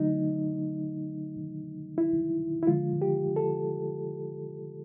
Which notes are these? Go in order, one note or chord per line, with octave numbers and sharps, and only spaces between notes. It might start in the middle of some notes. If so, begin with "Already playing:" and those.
Already playing: D3 F#3 A3 D#4
E4
E4
D3 F3 G#3 F4
G4
A4